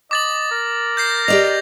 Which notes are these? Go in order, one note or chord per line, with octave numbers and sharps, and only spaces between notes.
D#5 D6 A6 F#7
A#4
G6 A#6 C7
G4 D5 D#5 F7